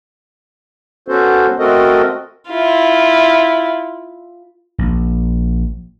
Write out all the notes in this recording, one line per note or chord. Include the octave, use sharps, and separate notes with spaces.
B3 C#4 F#4 A4 C5
A3 C4 F#4 A4 A#4 D#5
E4 F4
A#1